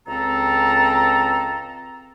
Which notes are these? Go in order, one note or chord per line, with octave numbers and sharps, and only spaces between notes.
C#2 C4 A4 A#5